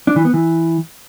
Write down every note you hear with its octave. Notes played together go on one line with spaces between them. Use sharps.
D4
E3
B3
E3